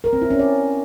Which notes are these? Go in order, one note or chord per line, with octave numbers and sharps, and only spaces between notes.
A#4
C4
E4
C#4
D5